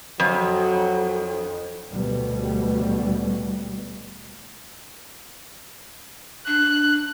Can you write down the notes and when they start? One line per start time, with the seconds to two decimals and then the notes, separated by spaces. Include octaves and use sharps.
0.20 F2 F#3
1.92 D2 B2 G3
6.47 D4 F#6